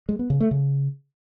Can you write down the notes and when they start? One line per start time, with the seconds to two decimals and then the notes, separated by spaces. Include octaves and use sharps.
0.09 G#3
0.19 B3
0.30 C#3
0.40 A3
0.51 C#3